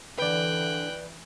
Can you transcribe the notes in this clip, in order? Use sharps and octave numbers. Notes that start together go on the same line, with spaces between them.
D3 E3 B4 D5 G5 F#6